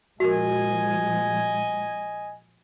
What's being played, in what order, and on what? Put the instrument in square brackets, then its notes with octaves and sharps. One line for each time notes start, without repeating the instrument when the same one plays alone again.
[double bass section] A#2 F3 G#3 [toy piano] F#4 A#4 [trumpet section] D#5 G#5